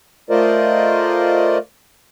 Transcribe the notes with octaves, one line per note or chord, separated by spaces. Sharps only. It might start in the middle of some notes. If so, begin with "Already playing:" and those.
A3 F4 A#4 C5 D5 D#5